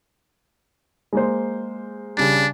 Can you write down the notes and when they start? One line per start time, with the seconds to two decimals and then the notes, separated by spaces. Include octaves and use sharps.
1.13 G#3 A#3 C5
2.17 C#3 G3 D4